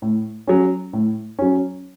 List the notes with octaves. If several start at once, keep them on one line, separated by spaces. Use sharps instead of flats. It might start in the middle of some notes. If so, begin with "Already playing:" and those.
A2
F#3 C#4
A2
F#3 C#4